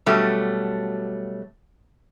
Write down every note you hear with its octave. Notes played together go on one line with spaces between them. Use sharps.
B2 F#3 G3 A3